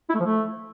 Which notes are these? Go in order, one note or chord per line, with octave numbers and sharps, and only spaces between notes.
E4
A3
F3
A3